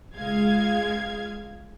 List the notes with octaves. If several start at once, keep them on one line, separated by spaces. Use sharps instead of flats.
C#2 G#3 F5 G#6